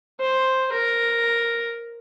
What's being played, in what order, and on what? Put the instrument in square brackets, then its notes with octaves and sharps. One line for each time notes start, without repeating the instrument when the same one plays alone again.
[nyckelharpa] C5
A#4